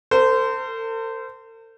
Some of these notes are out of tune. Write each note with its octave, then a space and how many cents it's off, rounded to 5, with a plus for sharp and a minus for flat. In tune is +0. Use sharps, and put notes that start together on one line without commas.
A4 +45 C5 -20